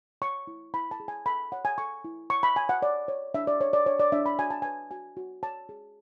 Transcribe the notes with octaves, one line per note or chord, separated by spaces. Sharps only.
C#5 C#6
E4
E4 B5
A5
G#4
G#5
A4 B5
C#5 F#5
G#5
A4 C#6
E4
C#5 C#6
B5
C#5 G#5
F#5
C#5 D5
C#5
D4 E5
D5
G#4 C#5
D5
D4 C#5
D5
D4 E5
B5
F#4 G#5
A5
B4 G#5
F#4 G#5
F#4
C#5 A5
G#4